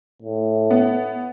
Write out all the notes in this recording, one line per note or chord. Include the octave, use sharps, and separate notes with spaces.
A2
B3